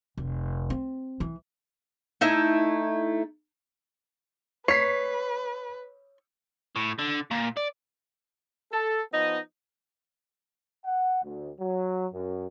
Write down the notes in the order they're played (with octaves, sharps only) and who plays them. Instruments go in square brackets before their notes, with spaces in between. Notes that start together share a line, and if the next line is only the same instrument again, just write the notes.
[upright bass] F1
C4
E3
[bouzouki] A3 D#4 E4
[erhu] B4 [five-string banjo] C#5 [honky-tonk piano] B6 C7
[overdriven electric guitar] A2
D3
A#2
D5
[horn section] A4
F3 B3 D#4 D#5
[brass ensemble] F#5
D2
F#3
F#2